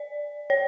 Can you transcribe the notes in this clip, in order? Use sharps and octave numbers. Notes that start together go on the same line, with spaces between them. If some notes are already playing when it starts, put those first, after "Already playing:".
Already playing: D5
C#5